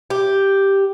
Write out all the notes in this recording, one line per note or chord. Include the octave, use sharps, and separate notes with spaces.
G4